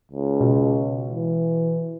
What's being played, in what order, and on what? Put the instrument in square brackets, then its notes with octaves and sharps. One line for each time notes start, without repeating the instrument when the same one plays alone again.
[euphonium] C#2
[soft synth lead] B2
[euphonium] E3